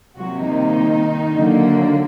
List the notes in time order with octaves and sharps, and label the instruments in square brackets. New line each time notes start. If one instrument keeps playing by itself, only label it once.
[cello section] C3 F#3 G3 A#3 F#4
D#3 D#4
D3 F#3 A#3